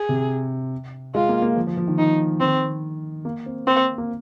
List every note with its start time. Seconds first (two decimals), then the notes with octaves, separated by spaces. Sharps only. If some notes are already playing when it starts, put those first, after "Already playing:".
Already playing: G#4
0.09 C3
1.15 G#3 F4
1.29 A#3
1.42 A#3
1.56 F3
1.67 F3
1.77 F3
1.88 D#3
1.98 D#3 D#4
2.40 D#3 C4
3.25 A#3
3.46 C4
3.67 A#3 C4
3.98 A#3